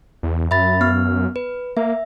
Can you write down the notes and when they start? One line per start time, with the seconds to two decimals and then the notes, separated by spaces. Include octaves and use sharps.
0.23 E2
0.51 F#2 E5 B5 A6
0.81 B3 F6
1.36 B4
1.77 A#3 E5